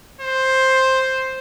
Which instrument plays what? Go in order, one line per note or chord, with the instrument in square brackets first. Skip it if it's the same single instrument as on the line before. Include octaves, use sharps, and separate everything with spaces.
[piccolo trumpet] C5